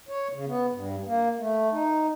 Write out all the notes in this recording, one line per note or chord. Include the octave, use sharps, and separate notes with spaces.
C#5
C#3
B3
G2
A#3
A3
D#4